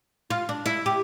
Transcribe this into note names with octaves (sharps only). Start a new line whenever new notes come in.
F4
D4
E4
G4